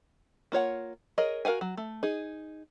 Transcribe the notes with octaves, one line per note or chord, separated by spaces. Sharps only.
A#3 F4 C#5 F#5
G#4 A#4 C#5 D#5
F#4 A#4 F5 F#5 G#5
F#3
A3
D#4 G#4